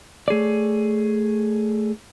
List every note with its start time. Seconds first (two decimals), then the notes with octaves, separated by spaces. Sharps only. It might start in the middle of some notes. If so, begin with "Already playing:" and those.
0.28 A3 G#4 C#5 D5